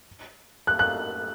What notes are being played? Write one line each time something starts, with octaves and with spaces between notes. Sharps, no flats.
F#6
F#6